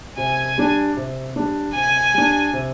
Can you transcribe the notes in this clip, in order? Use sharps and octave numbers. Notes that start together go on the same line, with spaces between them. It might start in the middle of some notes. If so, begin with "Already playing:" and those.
C3 G#5
G3 D4
C3
G3 D4
C3 G#5
G3 D4
C3